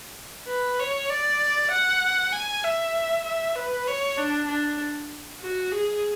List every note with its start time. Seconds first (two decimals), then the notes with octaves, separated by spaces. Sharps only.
0.48 B4
0.79 C#5
1.10 D5
1.71 F#5
2.33 G#5
2.64 E5
3.25 E5
3.56 B4
3.87 C#5
4.18 D4
4.48 D4
5.41 F#4
5.72 G#4